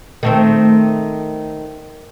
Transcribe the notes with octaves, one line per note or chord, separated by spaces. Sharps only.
D#3 A3 C4